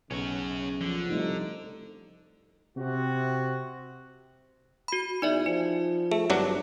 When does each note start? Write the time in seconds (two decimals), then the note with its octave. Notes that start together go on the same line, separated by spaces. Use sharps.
0.11 B1 C#3 C#4 F#4
0.81 D3 F3
1.10 C2 G3 A3 D#4
2.77 C3 F#4
4.88 F#4 B5
5.22 E2 D#4 D5 E5
5.46 F3 D#4
6.11 A3 G#4
6.30 G#1 G2 F#3 D4